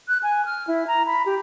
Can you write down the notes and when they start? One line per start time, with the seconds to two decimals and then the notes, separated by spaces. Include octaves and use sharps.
0.08 F#6
0.23 G#5
0.46 F6
0.68 E4
0.87 A#5
1.07 B5
1.26 G4